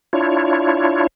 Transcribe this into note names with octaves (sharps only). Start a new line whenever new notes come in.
D4 E4 F4 C#5